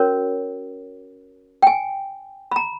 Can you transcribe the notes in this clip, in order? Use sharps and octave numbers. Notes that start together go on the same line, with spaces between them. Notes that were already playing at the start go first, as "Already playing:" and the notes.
Already playing: C#4 F#4 A#4 C#5
G5
G#5
B5
A#5